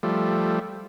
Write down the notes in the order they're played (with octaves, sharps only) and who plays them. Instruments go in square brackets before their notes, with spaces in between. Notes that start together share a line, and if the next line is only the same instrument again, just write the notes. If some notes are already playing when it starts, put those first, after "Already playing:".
[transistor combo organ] F3 G3 A3